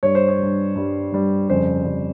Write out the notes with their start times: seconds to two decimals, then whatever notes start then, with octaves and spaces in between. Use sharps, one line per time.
0.03 G2 G3 C#5
0.15 C5
0.28 C#5
0.39 G2 G3
0.75 G2 G3
1.12 G2 G3
1.49 F2 C#3 G3 C5
1.85 F2 C#3 G3